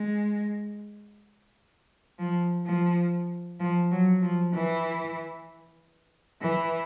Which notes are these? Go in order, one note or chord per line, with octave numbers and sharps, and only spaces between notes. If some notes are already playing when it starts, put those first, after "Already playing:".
Already playing: G#3
F3
F3
F3
F#3
F3
E3
E3